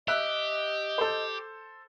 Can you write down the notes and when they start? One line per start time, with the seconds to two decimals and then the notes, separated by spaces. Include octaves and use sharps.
0.08 G4 D#5 E5 E6 F#6
0.98 A4 C5